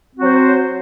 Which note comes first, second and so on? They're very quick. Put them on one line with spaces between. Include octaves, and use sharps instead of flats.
C4 F#4 F#3 C5